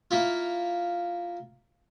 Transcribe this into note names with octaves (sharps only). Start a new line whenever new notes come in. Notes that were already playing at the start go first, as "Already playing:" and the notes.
A#3 E4 F4